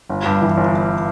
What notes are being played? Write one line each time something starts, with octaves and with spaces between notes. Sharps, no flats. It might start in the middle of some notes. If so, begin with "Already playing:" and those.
G1
G2
E3
G1
G1